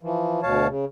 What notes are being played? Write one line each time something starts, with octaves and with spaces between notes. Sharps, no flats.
E3 F3
D2 B2 C#5 F5 A5
C#3